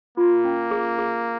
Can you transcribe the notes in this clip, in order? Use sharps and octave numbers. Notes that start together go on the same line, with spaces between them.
A#3 F4
C#4
G#4
G#4